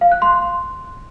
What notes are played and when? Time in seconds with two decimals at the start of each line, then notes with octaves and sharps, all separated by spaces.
0.01 F5
0.12 F#6
0.22 C6